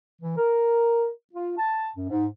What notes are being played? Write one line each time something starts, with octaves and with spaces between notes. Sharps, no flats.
E3
A#4
F4
A5
F#2
G#2